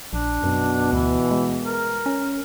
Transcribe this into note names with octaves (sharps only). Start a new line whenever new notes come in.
A#1 D4
F#2 B2
D2 E3
G#3
A#4
C#4